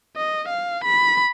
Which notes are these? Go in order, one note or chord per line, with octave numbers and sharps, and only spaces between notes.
D#5
F5
B5